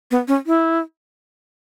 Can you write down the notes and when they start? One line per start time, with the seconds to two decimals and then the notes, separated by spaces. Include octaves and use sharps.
0.11 B3
0.28 C#4
0.46 E4